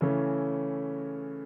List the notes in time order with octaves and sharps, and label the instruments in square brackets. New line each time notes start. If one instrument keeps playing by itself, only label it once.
[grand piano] C#3 E3 A3 C#4